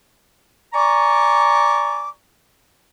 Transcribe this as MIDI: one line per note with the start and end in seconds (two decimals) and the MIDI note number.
0.73 2.07 74
0.73 2.07 80
0.73 2.07 82
0.73 2.07 85
0.73 2.07 86